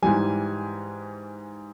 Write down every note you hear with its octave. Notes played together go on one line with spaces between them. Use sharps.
G#2 E3 G3 G#5